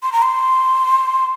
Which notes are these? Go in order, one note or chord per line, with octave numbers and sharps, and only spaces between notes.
C6
A#5
C6